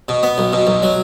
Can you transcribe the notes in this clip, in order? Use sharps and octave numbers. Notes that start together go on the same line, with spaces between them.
B2
B3
B1
B2
B1
F#3